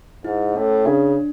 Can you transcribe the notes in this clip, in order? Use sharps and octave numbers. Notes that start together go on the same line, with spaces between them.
G#2 E4
A2 C#4
C#3 D4